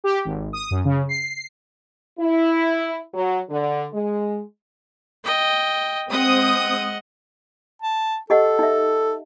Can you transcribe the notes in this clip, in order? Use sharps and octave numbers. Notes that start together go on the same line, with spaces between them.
G4
G#1
D#6
F#2
C#3
C7
E4
F#3
D3
G#3
D#5 G5
G#3 C4 D#5 F#5 D#6
A5
G4 A4 D#5 F#5
D#4 E5